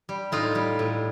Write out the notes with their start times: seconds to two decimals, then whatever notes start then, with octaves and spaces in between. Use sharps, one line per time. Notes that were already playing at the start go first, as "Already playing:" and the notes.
0.09 G3
0.32 A2 D#4 F4
0.55 G3
0.79 A2